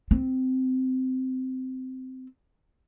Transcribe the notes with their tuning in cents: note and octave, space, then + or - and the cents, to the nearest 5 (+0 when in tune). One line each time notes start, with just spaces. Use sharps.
C4 -15